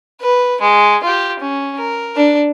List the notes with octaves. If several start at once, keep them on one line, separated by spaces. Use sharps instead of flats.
B4
G#3
F4 G4
C#4
A#4
D4